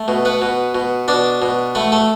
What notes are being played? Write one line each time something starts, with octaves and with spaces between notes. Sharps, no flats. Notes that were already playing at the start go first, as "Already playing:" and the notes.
Already playing: A3
B2
B3 B4
B2
B2
B2 D4 D5
B2
A3 B3 B4
A3 A4